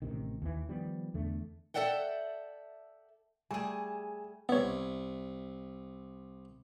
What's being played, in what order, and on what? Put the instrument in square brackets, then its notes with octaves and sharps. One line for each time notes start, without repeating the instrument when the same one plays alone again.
[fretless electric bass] A1 C3 D#3
D#2 E3
D#3 F3 G3 B3
E2 D3 A3
[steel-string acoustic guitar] A4 A#4 D5 E5 F#5 G5
[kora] G3 A3 [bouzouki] G#4 A5 [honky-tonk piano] G#5
[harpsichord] C2 E4 [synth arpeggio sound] B3 C#5